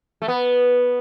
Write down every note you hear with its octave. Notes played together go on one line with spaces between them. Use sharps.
A3
B3